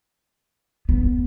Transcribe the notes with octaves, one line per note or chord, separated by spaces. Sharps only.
B3